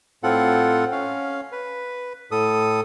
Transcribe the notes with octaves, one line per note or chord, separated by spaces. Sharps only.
A2 C4 F4 A4 F#5
C#4 F5
B4
A2 A4 D#6